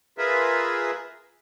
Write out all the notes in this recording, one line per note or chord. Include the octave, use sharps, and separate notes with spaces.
F4 G#4 A#4 B4 E5